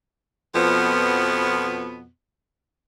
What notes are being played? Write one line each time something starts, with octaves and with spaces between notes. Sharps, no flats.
F2 B2 F3 B3